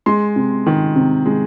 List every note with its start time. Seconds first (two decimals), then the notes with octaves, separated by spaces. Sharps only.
0.06 G#3 C6
0.36 C3
0.66 D#3
0.96 C3
1.26 G#3